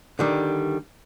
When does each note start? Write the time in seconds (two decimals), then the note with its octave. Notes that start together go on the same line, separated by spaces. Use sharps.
0.19 D3 D#3 G3